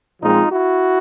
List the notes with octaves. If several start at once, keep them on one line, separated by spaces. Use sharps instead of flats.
A#2 F3 G#3 C4 D#4 F4
E4 F#4